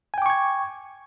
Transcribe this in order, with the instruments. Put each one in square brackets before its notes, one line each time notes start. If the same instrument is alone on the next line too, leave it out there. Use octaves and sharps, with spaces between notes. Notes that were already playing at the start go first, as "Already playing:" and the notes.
[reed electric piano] G#5
G5
D6
C#6
G#6